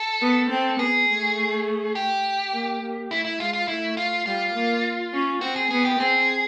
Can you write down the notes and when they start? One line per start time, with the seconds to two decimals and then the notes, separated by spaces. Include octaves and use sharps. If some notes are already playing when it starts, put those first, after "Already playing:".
Already playing: A4
0.21 B3
0.50 C4
0.79 B3 G#4
1.09 A3
1.95 G4
2.53 A#3
2.81 A#3
3.11 A3 E4
3.25 E4
3.39 G#3 F4
3.53 F4
3.68 A3 E4
3.97 F4
4.26 G3 F4
4.55 A#3
5.13 C#4
5.41 C4 F#4
5.56 G#4
5.71 B3 G#4
5.85 G4
5.99 C4 G#4